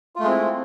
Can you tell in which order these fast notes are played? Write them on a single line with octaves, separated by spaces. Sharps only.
F4 A3 G#3 C4 E4